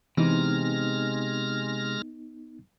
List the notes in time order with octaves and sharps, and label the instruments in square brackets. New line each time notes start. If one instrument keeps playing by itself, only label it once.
[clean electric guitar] C3 [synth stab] E3 [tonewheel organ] G#3 F6 A#6 [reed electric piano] B3 D#4